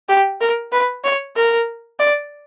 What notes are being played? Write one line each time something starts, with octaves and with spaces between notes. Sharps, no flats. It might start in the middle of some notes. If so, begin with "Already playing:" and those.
G4
A#4
B4
C#5
A#4
D5